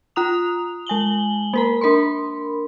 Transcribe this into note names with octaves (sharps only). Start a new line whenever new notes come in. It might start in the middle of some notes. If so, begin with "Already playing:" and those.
F4 A#5 D#6 F7
G#3 G#5 F#7 G7
A#3 A#4 A#5
D4 A#4 B5 C6